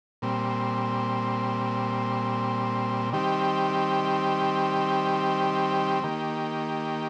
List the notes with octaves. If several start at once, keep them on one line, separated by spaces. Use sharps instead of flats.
A#2 G3 C4
D#3 G3 C4 G4
D#3 A#3 G4